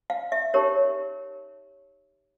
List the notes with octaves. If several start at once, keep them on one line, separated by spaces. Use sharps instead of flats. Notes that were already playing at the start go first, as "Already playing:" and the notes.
F5
E5
D#4 G4 A#4 C#5